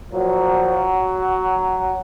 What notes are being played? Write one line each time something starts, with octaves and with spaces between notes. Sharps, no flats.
A#2 F3 F#3